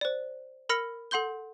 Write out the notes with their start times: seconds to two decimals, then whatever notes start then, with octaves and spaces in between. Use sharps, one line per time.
0.01 C5 D5
0.69 A#4 B5 F6 A#6 C#7
1.11 A4 F#5 C6 G6 G7